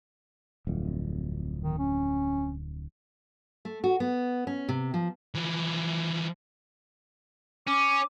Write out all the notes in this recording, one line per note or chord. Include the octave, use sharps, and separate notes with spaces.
D1 F2
D#3
C#4
A3
F#4
B3
C#4
C3
F3
E3 F3
C#4 D6